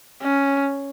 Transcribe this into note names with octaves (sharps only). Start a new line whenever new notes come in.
C#4